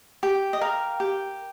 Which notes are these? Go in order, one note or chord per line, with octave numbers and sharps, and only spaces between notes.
G4
D#5
A#4 F5
G4